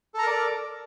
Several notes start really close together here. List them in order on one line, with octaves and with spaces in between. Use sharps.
A4 A#5 A#4 D5